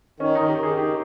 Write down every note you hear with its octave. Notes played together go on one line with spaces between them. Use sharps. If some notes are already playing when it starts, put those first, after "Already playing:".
D#3 C#4
D#3 D#4
G4
D#3 G#4
D#3 G4